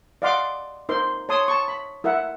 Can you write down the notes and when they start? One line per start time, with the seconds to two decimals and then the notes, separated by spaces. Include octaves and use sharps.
0.22 D5 D#5 F5 F#5 C6 D6
0.89 D#4 A#4 C5 C6
1.29 C#5 A5 C6 D#6
1.48 A5 C#6
1.68 B5
2.04 E4 A#4 E5 F#5